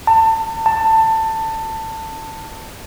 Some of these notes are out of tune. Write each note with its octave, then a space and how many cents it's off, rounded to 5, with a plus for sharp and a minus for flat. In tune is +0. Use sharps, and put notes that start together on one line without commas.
A5 +30
A5 +20